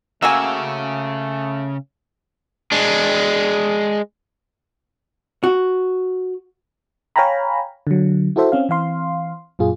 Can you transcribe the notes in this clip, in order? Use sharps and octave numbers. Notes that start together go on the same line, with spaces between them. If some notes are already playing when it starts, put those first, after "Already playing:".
C#3 A3 A#3 F#4 G#5 E6
G#3 D4
F#4
C#5 F5 G5 G#5 A#5 B5
D3 F#3
E4 F#4 A4 C5 E5
C4 C#4 F5
E3 C4 F5 C6
F#2 A#2 F4 G#4